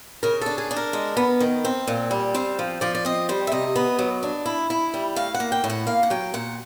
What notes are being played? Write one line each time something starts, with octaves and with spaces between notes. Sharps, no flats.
C#3 A#4
D4 A4
G#4
D4
A#4
G#3
B3
D#3
C4
A#2
G3
C4 C5
F3
F3 D5
D5
C4 D#5
G3 C5
E5
C3 D#5
B3
F#3
D4
E4
E4
G3
A2 F5
F#5
A#3
G5
A2
F#5
A#3 F5
F#5
F#3 G5
A#2 F#5